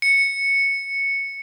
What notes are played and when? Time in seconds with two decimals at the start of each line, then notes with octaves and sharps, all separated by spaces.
0.02 C#7